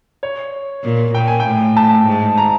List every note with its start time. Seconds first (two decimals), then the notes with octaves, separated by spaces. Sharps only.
0.23 C#5
0.84 A#2
1.14 A#2 G5
1.28 G#5
1.40 G5
1.46 A2
1.77 A5
2.07 G#2
2.38 A#5